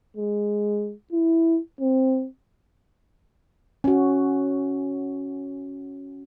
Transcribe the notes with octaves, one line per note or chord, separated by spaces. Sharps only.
G#3
E4
C4
C#4 F#4